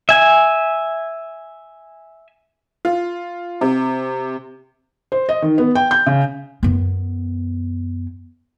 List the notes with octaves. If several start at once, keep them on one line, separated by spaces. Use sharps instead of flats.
E5 G#5
F4
C3
C5
D#5
D#3
B3
G5
G6
C#3
F#2 B3